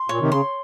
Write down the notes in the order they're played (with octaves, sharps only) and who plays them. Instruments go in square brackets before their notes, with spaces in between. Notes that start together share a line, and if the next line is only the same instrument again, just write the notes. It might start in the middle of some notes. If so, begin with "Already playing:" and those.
Already playing: [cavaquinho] C6
[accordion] A#2 [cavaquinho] C#5
[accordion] C3 D#3
[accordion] C#3 [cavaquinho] C6